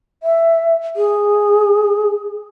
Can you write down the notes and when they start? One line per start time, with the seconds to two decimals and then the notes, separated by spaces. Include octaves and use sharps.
0.23 E5
0.96 G#4